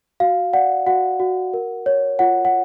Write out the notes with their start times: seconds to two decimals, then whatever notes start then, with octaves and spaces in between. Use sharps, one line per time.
0.20 F#4 F5
0.53 D5 F#5
0.86 F#4 F#5
1.20 F#4
1.54 A#4
1.86 C#5
2.19 F4 F#5
2.45 F#5